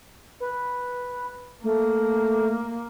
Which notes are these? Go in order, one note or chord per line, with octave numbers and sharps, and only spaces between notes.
B4
A3 A#3